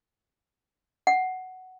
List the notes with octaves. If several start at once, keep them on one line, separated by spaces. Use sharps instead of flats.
F#5